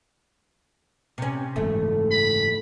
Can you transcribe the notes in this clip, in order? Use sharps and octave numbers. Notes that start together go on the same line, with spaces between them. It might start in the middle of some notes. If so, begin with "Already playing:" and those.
C3 C#4
F#1 G#2 E3 A3
B5